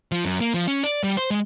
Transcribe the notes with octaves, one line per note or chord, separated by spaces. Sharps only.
F3
F#2
A#3
F3
C#4
D5
G3
C5
G#3